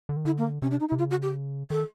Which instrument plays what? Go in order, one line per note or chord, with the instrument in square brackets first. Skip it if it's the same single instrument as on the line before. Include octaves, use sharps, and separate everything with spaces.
[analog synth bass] D3
D#3
[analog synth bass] D3 [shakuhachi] E4
[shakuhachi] A#3
[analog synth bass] C3 [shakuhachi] C#4
[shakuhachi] D4
D#4
E4
[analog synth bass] C3
[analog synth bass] C#3 [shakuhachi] F4
[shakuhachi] F#4
G4
[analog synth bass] D#3 [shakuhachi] A4